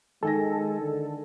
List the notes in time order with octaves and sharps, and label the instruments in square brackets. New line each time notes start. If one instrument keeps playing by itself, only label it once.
[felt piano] D#3 G#5 A#6 [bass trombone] G#3 [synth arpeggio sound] A4
[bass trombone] D3